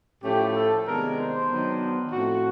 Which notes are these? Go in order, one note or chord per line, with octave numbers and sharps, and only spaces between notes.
A2 F3 A3 C#4 G4
A4
C3 D#3 G#3 B3 D4 A#4
C5
D#3 F#3 B3 D4
A2 F3 A3 C4 F#4